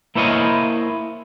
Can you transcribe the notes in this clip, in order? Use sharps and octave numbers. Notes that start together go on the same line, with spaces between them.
A#3 E4 C5 C#5 D#5 F5